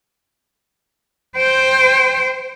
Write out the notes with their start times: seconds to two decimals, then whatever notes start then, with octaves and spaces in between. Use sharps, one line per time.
1.36 C5 G5